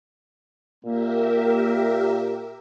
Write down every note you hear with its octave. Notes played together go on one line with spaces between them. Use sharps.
A#2 A#3 G4 A#4 E5